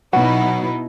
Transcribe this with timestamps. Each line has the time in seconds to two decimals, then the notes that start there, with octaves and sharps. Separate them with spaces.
0.13 B2 F#3 B3 D#4 E4 F#4